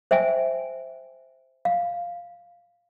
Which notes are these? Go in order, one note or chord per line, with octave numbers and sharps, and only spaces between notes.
C5 E5 G5 G#5
F5